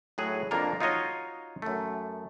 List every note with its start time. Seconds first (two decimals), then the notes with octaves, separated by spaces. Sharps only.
0.18 A2 F#3 G#4 C#5 F#5
0.51 F2 A#3 D4 F4 A#4 A#5
0.80 D#4 F4 F#4 C#5 D#5
1.62 F#2 A3